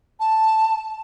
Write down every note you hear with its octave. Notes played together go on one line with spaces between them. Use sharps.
A5